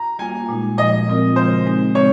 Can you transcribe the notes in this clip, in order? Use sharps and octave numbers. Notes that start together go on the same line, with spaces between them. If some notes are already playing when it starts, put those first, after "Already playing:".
Already playing: A#5
G3 A#3 F4 G#5
A#2 G#3 D#4
A#2 F3 G#3 D#5
A#2 F3 C4 F4 A#4
C#3 F3 G#3 C5
G#3 C4 D#4 G#4
C#3 G#3 C4 C#5